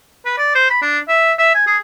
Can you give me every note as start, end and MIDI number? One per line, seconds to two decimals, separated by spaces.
0.25 0.37 71
0.38 0.53 74
0.55 0.67 72
0.70 0.77 83
0.82 0.98 62
1.08 1.32 76
1.38 1.53 76
1.54 1.64 80
1.67 1.77 68